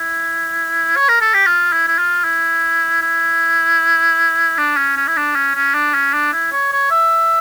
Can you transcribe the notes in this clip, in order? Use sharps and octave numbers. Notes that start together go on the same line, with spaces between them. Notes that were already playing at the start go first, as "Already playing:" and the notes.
Already playing: E4
C#5
A#4
A4
G4
F4
E4
E4
F4
E4
E4
D4
C#4
C#4
E4
D4
C#4
C#4
D4
C#4
D4
E4
C#5
C#5
E5